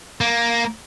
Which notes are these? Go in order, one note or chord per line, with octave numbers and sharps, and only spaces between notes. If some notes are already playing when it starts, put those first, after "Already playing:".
A#3